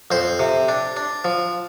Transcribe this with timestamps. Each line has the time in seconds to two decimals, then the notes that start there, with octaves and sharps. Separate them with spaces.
0.11 F2 C5
0.39 C3
0.68 D4
0.96 D4
1.25 F3